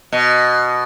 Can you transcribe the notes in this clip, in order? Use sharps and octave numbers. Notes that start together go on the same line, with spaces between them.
B2